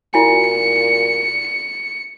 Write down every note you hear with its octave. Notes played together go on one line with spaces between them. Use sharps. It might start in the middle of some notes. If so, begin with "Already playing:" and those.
A#2 E4 F#4 G#5 C#7